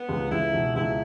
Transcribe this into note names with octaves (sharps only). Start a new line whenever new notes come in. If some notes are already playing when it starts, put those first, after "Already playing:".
Already playing: B3
C#2
C#2 E4
B2
C#2 E4